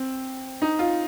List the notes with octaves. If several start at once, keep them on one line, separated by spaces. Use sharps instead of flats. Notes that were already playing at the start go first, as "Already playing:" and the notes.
Already playing: C4
D#4
F4